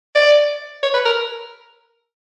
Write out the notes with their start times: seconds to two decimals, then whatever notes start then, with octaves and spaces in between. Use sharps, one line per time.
0.15 D5
0.83 C#5
0.94 B4
1.05 A#4